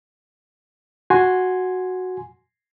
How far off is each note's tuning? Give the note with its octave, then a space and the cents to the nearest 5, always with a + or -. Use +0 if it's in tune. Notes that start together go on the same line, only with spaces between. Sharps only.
F#4 -5 G#5 +0 C6 +0